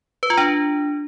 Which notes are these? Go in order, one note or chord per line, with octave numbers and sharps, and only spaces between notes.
B4
F4
D4